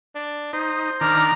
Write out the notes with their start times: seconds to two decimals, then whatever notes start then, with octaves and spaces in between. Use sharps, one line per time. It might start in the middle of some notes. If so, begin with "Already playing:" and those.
0.15 D4
0.53 D#4 C5
1.01 D#3 D4 A#5 F6